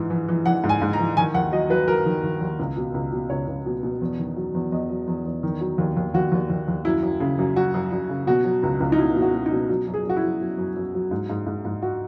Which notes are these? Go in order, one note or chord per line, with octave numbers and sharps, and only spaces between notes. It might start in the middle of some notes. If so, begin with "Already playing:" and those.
Already playing: G#2 E3
E3
E3
E3 F#5
G#2
G#5
G#2
A#5
E3
D#3 G#5
D#2 F#5
F#3 D#5
F#3 B4
F#3 A#4
D#3
D#3
D#2
C#2
B2
C#2
B2
C#2 C#5
C#2
B2
B2
E2
D#3
F#3
E2
E2 D#5
F#3
E2
E2
D#3
F#3
D#2
D#2
D#2 F#4
D#2
D#2
D#2
F#2 E4
F#2
C#3
F#2
F#2 F#4
F#2
F#2
C#3
B2 F#4
F#3
C#2
C#2
D#4
B2 E4
B2
F#4
B2
D#4
B2
F#3
F#2
G#4
F#2 F#4
E4
F#3
F#3
F#2
F#2
F#3
G#2
G#2
G#2
G#2
F#4